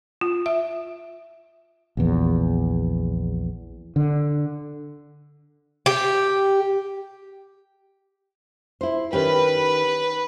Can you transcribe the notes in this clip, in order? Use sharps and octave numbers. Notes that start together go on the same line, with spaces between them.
F4
E5
A#1 E2
D3
G4
E4 C5
D#3 C#4 G4 B4